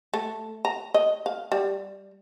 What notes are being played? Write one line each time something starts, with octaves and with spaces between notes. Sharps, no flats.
A3
A#5
D#5
F5
G3